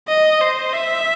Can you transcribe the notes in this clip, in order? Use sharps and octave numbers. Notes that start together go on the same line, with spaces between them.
D#5
C5
E5